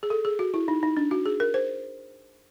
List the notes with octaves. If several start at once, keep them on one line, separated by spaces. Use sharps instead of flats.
G#4
A4
G#4
F#4
E4
D#4
D#4
D4
F#4
G#4
A#4
C5